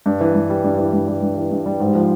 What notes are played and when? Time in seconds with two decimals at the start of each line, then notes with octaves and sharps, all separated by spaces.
0.06 G2
0.20 E3
0.35 G2
0.49 G3
0.64 G2
0.79 E3
0.93 G2
1.08 G3
1.22 G2
1.37 E3
1.51 G2
1.66 G3
1.80 G#2
1.95 F3